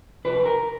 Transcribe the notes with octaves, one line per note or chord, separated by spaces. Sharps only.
F2 C3 B4
A#4